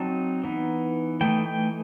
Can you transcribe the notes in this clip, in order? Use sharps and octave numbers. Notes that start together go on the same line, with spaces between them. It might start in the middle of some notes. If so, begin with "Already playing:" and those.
Already playing: F#3 C4 D#4 A5
E3 B3 D#4
E3 A3 D#4 G5
G5